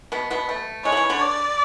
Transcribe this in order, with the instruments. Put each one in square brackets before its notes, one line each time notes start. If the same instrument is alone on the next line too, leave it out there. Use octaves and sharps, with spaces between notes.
[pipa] B2 B3
B2 B3
A3
[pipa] G#3 [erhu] C#5
[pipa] F#3
E3
D3
[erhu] D5